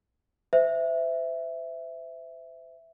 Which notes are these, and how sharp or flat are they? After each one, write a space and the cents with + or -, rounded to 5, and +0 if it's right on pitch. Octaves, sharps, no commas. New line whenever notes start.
C5 -40 E5 +0